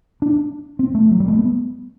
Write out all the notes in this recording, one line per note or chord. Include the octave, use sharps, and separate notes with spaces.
D4
C4
A3
F#3
G3
A3
B3